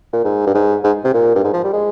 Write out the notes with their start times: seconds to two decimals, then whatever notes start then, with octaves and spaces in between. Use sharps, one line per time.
0.13 A#2
0.24 G#2
0.47 G2
0.54 G#2
0.84 G#2
1.04 C3
1.14 A#2
1.35 G2
1.44 G#2
1.53 F3
1.64 G3
1.73 G#3